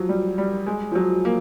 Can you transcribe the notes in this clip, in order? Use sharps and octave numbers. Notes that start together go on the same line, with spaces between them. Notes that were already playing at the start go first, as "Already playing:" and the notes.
Already playing: F3 F#3
G3
G3
G#3
F3
F#3
A#3